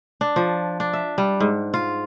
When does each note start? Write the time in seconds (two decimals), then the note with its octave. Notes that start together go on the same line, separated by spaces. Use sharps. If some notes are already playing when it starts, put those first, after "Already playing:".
0.21 D4
0.36 F3
0.80 D4
0.93 E5
1.18 G3
1.40 G#2
1.74 F4